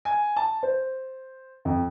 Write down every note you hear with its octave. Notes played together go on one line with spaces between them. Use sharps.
G#5
A5
C5
F2